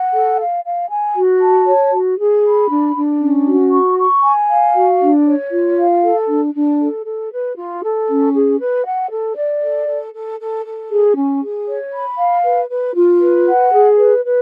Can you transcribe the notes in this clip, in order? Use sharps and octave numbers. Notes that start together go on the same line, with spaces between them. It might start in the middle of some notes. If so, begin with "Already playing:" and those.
Already playing: F#5
A4
F5
F5
G#5
F#4
A5
C#5
F#4
G#4
B5
D4
D4
C#4
F#4
C#6
C#6
G#5
F5
F#4
D4
C#5
F4
F5
A4
D4
D4
A4
A4
B4
F4
A4
C#4
G#4
B4
F#5
A4
D5
A4
A4
A4
A4
A4
G#4
C#4
G#4
C#5
B5
F5
B4
B4
F4
B4
F#5
G#4
B4
B4